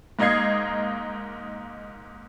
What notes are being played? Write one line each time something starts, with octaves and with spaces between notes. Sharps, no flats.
G#2 A#3 D#4 D#5 G#6 C7